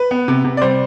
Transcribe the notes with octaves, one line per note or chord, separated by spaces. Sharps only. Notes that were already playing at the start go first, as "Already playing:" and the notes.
Already playing: B4
B3
C3
C3
D5
G3 C5